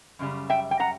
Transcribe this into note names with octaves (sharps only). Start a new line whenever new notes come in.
F#2 C#3 G3
E5 G5
G5
F#5 A#5